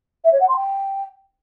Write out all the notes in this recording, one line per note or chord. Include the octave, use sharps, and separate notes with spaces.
E5
C#5
F#5
C6
G5